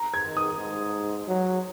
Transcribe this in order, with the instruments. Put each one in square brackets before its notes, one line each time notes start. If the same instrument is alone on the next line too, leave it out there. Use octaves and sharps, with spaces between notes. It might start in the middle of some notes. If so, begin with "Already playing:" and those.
Already playing: [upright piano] A#5
G#6
[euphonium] D#3
[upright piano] D#6
[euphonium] G#2
F#3